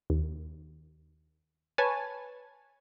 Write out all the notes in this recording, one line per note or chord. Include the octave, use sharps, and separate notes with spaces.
D#2
B4 C#5 G#5 A5